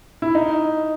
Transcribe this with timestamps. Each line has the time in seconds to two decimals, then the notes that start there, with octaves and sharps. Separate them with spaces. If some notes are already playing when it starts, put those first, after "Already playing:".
0.22 E4
0.35 D#4